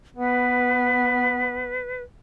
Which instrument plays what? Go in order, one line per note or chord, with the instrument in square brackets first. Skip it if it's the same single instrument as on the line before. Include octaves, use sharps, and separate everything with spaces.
[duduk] B3 [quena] B4